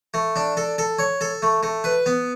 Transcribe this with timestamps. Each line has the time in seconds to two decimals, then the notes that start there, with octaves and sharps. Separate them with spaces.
0.14 A3
0.36 D4
0.57 A4
0.78 A4
0.99 C#5
1.21 A4
1.42 A3
1.63 A3
1.84 B4
2.06 B3